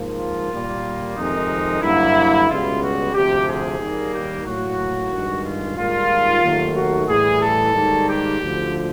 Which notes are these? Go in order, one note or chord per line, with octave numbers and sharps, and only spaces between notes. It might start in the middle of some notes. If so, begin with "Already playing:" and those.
Already playing: G#2 F3 A#3
F4
A#2 G3 A#3
F2 C3 D#3 G#3 D#4
G2 D3 F#3 A#3 E4
C#2 B2 G3 F4
F#4
D2 C3 F3 G4
G#4
D#2 D#3 G3 A#3
G4
A2 F#3 A#3 F#4
G2 D#3 G#3
F4
G#2 D#3 G3 A#3 F4
D#2 D#3 F#3 A3
F#4
A2 E3 G3 G#4
A4
G#2 D#3 G3 A#3
G4
D2 D3 F3